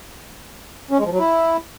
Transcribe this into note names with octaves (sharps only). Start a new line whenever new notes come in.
C#4
G#3
F3
F#3
E4